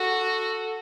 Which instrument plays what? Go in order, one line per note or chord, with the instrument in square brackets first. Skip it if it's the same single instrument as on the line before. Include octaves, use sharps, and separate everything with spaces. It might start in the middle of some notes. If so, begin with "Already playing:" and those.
Already playing: [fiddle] F#4 [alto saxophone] A4